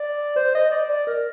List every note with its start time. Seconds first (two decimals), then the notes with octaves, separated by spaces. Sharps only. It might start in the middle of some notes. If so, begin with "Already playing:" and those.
Already playing: D5
0.36 C5
0.55 D#5
0.71 D5
0.90 D5
1.07 A#4